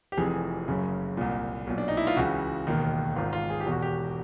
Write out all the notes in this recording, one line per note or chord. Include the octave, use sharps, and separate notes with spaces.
G4
F1 F2 C3 E3 G#4
F#1 F#2 C#3
C2 A#2
B1 A#2
D4
D#4
E4
F4
C#2 C#3 E3 F#4
E1 D#2 D#3
G#1 G#2 D#3 F4
F4
G#4
G4
E1 E2 B2
F#4
G4